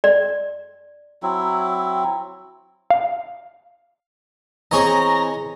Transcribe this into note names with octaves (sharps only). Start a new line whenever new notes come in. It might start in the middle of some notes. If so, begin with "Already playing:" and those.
D5
F#3 C4 E4
F5
E3 C4 G#4 C#5 D#5 A#5